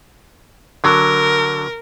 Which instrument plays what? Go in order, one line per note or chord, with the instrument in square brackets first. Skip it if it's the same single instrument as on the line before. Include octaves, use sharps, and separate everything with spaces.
[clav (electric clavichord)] D3 F#3 [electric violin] A#4